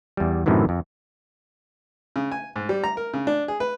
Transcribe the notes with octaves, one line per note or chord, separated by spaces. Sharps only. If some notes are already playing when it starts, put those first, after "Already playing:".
E2 G3
F#2 A2 C3 D#3 E3
F2
C#3
G#5
G#2
G3
A#5
A#4
C#3
D4
G#4
B4